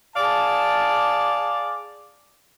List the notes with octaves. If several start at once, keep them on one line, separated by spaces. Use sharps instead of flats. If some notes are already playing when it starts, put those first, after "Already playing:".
G#4 D5 F5 A5